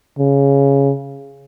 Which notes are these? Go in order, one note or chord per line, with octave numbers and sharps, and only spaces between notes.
C#3